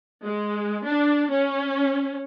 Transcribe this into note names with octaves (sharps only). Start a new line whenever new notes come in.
G#3
D4
C#4